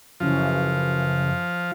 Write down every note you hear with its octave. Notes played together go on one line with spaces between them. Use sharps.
F#2 C#3 E3 F3